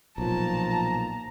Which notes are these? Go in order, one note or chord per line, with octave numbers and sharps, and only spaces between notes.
B1 A#2 F3 A5 A#5